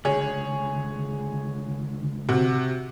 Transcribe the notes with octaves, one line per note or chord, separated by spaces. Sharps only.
C#2 D3 G#4 C#5
C3 F#4